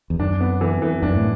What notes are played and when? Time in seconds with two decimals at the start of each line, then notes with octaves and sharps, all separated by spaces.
0.10 E2
0.19 F#2 D4
0.41 B3
0.61 E3
0.82 E3
1.02 F#2 D4
1.16 A2